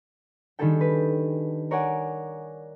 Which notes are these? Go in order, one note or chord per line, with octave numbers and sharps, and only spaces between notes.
D#3 G3 D4 G#4 A4 G5
B4
A#4 C#5 D5 F#5 G#5